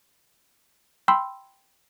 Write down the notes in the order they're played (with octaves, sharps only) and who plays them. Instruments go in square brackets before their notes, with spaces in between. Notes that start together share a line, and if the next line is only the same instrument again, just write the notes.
[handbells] G5 B5 C6 E6